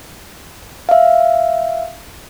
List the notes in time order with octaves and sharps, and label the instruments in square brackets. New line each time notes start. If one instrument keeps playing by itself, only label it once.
[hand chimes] E5 F5